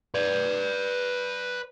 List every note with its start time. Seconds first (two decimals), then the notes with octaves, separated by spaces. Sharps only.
0.15 B4 D5